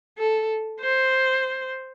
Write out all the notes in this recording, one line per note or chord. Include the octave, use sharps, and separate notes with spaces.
A4
C5